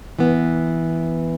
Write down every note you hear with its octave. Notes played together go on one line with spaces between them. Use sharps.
E3 B3